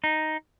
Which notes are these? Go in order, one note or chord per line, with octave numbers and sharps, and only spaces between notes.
D#4